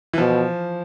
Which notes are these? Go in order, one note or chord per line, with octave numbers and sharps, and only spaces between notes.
E3
B2 F3